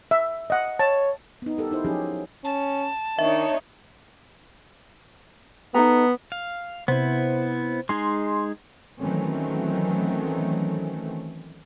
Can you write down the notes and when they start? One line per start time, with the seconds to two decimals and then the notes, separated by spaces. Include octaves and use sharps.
0.11 E5
0.50 D#5 F#5
0.79 C#5 A5
1.42 B3 D#4
1.58 G4 A4 A#4
1.71 D#4 E4 C5
1.85 F3 F#3 C#4 D#4 G4 G#4
2.44 C#4 A5
3.19 D#3 D4 D#4 C#5 E5
5.74 B3 D#4 A4 A#5
6.32 F5
6.88 C3 B3 E4 C5
7.89 G#3 D#4 G#4 C6
8.99 D#3 E3 F#3 A3 C4 C#4